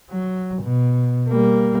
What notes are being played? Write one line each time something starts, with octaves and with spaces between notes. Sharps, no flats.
F#3
B2
G3 A#3